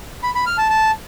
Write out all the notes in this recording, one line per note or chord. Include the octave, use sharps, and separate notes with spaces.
B5
B5
F6
A5
A5